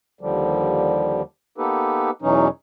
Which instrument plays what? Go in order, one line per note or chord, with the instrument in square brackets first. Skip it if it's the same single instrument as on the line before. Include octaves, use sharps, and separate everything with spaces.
[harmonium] D#2 D3 F3 G3
A#3 B3 D#4 G4 A4 B4
E2 B2 E3 F#3 C#4 D#4